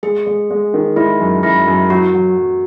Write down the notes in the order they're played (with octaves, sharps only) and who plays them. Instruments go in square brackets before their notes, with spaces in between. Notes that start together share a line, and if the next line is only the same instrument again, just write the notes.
[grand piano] G#3 [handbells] G#4
[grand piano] G#3
G#3
D#3
[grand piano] G#3 [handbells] E4
[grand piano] F#2
[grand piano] F#2 [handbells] E4
[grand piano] F#2
[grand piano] F#3 [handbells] F#4
[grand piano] F#3
F#3